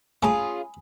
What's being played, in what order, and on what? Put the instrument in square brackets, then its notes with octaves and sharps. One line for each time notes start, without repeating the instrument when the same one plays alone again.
[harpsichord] A3 [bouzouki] C#4 F4 G#4 [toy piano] G#5 B5 D#6